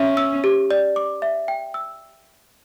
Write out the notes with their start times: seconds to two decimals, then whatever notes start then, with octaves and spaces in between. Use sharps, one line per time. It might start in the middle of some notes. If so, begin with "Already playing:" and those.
Already playing: C#4 E5
0.17 E6
0.44 G4
0.71 D5
0.96 D6
1.22 E5
1.48 G5
1.74 E6